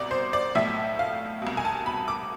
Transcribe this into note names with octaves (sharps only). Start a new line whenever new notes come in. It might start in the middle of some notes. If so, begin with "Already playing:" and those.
Already playing: C2 B2 D5
C5
D5
B1 A2 F3 E5
F5
C2 B2
G#5
A5
B5
D6